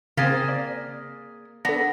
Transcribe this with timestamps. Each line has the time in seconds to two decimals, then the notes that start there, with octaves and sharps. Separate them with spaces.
0.17 C#3 A#3 C4 G#4 G#6 A6 B6
0.48 D5
1.65 B3 D4 A4 A#6